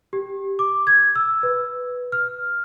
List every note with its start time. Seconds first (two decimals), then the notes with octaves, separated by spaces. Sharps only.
0.13 G4
0.59 D6
0.87 G#6
1.15 E6
1.43 B4
2.12 F6